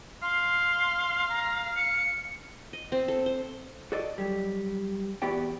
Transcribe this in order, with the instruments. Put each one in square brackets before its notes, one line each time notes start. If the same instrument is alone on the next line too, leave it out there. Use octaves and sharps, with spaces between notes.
[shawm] F5 [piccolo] C6
[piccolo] A#5
C#7
[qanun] D#5
C4
A4
C5
[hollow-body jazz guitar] F#4 A4 D5 D#5
F#3 G3
E2 B3 F#4 G4 D5 G5